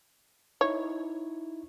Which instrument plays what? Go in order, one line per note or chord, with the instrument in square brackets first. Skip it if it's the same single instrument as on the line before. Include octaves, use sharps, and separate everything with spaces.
[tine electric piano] D#4 E4 [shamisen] C#5